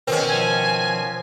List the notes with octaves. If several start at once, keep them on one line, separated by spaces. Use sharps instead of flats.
B2 D#3 C4 C#4
F3 G#5